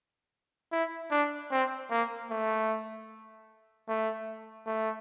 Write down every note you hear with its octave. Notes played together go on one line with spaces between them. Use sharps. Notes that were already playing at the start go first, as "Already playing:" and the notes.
E4
D4
C4
A#3
A3
A3
A3